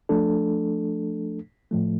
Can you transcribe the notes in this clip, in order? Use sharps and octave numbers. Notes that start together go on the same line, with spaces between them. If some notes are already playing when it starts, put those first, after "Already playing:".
F3 A3 D4 A4
A2 F3 A3